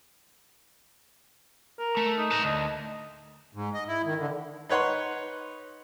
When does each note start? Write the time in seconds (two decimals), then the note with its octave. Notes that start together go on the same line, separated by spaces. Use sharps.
1.78 A#4
1.97 A3
2.18 D#4
2.31 B4 A5
2.44 D2 D#5
3.54 G#2
3.74 D#5
3.88 E4
4.05 D#3
4.19 D3
4.69 D#4 B4 C#5 F#5 C6